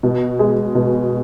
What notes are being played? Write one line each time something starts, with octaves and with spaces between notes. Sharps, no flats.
B2
G#3
B2